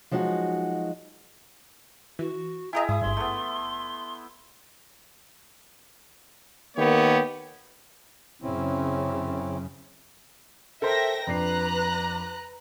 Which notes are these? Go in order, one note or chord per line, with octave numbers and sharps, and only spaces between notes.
F3 F#3 G#3 D#4 F#4
E3 F#4
E4 G#4 D#5 E5 G5 G#5 A#5
G#2 E4 D#6
G#1 G2 C6
A3 B3
D#3 A#3 B3 G4 C#5
F#2 C#3 C4 C#4 E4
A4 A#4 C5 E5 G5 A#6
F2 D4 B4 A#5 F#6 C7